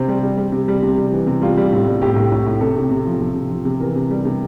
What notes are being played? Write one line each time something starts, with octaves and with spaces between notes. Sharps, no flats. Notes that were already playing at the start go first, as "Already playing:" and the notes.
Already playing: C3 C5
G3
G3
G3
C3
G3
C3
G3
E3
C3
G3 F4
G3
A2
G3
A2 G4
A2
A2
A2
C3 A4
C3
C3
F3
C3
C3
F3
C3
E3 A#4
C3
G3
C3